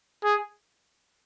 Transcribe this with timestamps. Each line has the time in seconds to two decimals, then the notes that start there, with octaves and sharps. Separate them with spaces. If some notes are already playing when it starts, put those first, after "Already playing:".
0.24 G#4